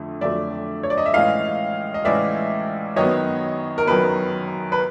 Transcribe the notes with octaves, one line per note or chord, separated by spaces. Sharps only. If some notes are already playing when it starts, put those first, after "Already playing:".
Already playing: F2 D3 A3
F2 D3 F#3 A3 D5 E5
C#5
D5
D#5
E5
A2 E3 G#3 C#4 E4 D#5 F5
D#5
A2 E3 G#3 C#4 E4 D5 E5
F#2 D#3 F#3 B3 C#5 D#5
A#4
F#2 D#3 F#3 B3 B4
B4